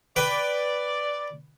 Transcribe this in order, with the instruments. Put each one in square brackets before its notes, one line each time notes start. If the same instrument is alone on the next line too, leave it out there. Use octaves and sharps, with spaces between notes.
[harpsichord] B4 G5 [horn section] D5